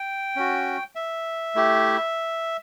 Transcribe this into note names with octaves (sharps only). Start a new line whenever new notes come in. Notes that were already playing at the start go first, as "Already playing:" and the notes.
Already playing: G5
C#4 F#4
E5
A3 E4 G4